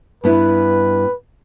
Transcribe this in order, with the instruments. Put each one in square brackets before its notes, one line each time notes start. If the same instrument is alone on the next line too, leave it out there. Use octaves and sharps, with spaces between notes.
[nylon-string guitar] G2 B3 E4 [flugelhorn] B4